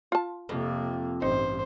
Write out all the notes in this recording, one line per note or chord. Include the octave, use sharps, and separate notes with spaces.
F4 A5
F2 C3 A#3
A1 G2 D#4 C5